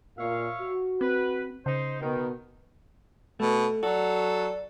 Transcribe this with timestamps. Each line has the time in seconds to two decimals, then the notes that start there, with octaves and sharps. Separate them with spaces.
0.18 A#2 C#5 E5 F5
0.60 F#4
1.01 C4 B4
1.66 C#3 D#4 C5
2.01 B2 D#3 B3 A#4
3.40 B2 A3
3.83 F#3 F#4 A4 D5